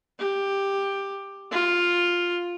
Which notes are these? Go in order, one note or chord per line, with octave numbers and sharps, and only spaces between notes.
G4
F4